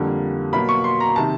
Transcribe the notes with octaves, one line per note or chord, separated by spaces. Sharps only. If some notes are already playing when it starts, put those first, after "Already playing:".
Already playing: F2 D3 G3 A#3
B2 F#3 A#3 B5
C#6
C6
A#5
C3 D#3 A5